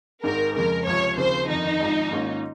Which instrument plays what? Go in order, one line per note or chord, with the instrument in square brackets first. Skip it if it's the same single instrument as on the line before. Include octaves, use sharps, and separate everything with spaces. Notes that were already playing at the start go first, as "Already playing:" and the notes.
[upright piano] G#1 G#2 D#3 G#3 [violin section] A#4
[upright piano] F2 C#3 G#3 [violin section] A#4
[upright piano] C#2 C3 F3 [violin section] C#5
[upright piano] D#2 C#3 F3 C4 [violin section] C5
[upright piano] G1 F2 D#3 [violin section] D#4
[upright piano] G#1 G#2 F3
G#2 D#3 A#3 C#4 F4